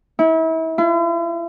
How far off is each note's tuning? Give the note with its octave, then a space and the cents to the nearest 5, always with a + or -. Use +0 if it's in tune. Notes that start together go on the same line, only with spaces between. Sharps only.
E4 -35
E4 +45